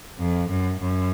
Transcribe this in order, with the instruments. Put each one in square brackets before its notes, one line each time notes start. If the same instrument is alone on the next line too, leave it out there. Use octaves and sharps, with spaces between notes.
[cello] F2
F#2
F#2